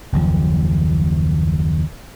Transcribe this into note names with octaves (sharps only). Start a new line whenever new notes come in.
F#1 D#2 F3